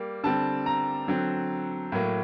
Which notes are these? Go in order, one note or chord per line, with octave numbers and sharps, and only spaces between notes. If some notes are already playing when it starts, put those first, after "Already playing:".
Already playing: G3 A#3
D3 G3 C4 A5
A#5
D3 F#3 C4
A2 F#3 A#3